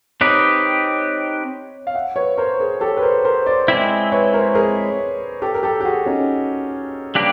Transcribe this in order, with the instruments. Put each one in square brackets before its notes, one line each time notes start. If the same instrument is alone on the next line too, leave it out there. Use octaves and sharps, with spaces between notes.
[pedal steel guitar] C4 D#4 G4 B4 [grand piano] C#5 D#5
[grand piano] F5
E5 F#5
B4 C#5
A#4 C5
G#4 A#4
G4 A4
B4
A#4 C5
A#4 C5
C5 D5
[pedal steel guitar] G#3 C4 E4 [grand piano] D5 E5
[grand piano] B4 C#5
A#4 C5
G#4 A#4
G4 A4
A#4
G4 A4
G4
F#4 G#4
C#4 D#4
[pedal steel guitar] G3 A#3 D4 G4 B4